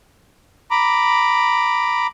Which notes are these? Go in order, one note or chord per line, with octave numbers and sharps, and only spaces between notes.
A#5 B5 D6